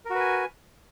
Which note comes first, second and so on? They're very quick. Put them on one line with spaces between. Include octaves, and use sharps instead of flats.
A#4 F#4 B4 G#5